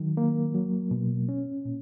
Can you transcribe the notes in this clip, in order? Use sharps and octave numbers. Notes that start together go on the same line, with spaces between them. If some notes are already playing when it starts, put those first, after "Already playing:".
Already playing: D#3 F#3
A#3
F#3
B2
C#4
A#2